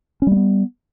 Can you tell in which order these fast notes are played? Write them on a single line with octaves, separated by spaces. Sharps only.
C#4 G3 A#3 B3